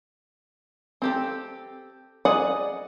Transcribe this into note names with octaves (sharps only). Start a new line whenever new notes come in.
C4 G4 A4
G#4 D5 D#5 F#5 G#5